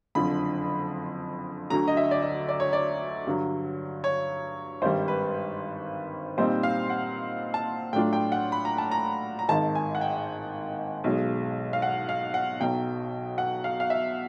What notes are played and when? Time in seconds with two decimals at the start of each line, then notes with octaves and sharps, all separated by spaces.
0.15 F#1 F2 D3 F3 B5
1.70 D2 D3 F#3 A#5
1.88 D#5
1.97 E5
2.11 D5
2.22 D#5
2.49 D5
2.60 C#5
2.73 D5
3.27 G2 D3 F#3
4.04 C#5
4.82 G#1 G2 D#3 G3 C5
5.08 B4
6.37 A#2 G3 C4 D#4 C5
6.63 F5
6.90 F#5
7.54 A5
7.93 A2 F#3 A3 D4 F4 G5
8.13 G5
8.32 F#5
8.52 B5
8.65 A#5
8.78 A5
8.91 A#5
9.39 A#5
9.49 G#1 G#2 D#3 A5
9.75 G#5
9.95 F#5
10.01 G5
11.04 B1 B2 G#3
11.73 F5
11.82 F#5
12.09 F5
12.34 F#5
12.60 B1 B2 F#3 G5
13.38 F#5
13.64 F5
13.80 F5
13.90 E5